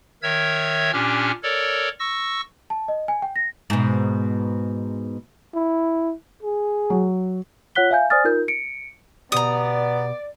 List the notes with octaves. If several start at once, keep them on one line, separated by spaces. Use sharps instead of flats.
D#3 A#4 C#5 E5 E6 G#6
A#2 C#4 D4 G4 F6
A4 A#4 C#5 D5
C#6 E6 A#6
A5
D#5
G#5
G5
A#6
G#2 B2
E4
G#4
F#3
F4 C#5 F#5 F#6 B6 G7
E5 F5 G#5 G6
C5 D5 G#5 D#6 F6 A6
D#4 F4 A#4 G6
C#7 D7
B2 B3 G4 D5 A#5 D#6